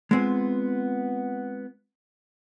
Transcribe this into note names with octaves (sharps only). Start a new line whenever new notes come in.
G#3 B3 C4 F4